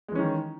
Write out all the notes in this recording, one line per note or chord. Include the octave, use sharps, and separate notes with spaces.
D#3 E3 G#3 C#4